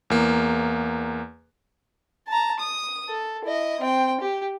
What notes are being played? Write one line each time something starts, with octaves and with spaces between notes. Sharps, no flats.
E2 A#3
A5 A#5
D#6
A4
E4 D#5
C4 G5
G4